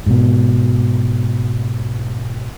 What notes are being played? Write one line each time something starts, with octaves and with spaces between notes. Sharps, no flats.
G#2 B2